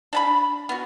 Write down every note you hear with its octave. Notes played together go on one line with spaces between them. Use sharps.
D4 A5 B5
B3 F#4